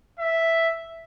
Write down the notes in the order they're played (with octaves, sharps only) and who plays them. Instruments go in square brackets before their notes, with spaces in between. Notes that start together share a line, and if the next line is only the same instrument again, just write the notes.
[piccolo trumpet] E5